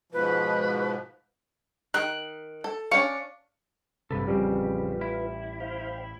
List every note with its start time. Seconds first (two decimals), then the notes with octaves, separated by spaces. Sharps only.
0.12 G#2 B2 F3 B4
1.94 D#3 F#6
2.64 A4
2.92 C#4 D4 F5 C#6
4.11 A1 G2 C3 A4 B4
4.27 A1 F2 C#3 G3 C4 F4 B4
5.01 E4
5.60 C5 F5 G5